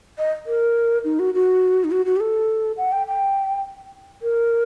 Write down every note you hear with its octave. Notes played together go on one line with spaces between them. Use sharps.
D#5
A#4
D#4
F#4
F#4
D#4
F#4
F#4
G4
A4
F#5
G5
G5
A#4